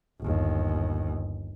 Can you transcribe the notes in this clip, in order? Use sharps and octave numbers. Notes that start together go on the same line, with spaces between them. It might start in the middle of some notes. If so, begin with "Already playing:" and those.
G1 D#2